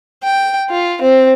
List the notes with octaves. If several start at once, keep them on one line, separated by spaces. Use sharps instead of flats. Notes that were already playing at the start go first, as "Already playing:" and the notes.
G5
F4
C4